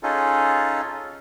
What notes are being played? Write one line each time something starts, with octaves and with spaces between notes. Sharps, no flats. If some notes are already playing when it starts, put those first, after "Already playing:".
C#4 D#4 F4 G#4 A4